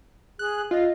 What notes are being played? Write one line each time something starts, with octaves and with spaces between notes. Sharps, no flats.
G#4 F#6
F4 D#5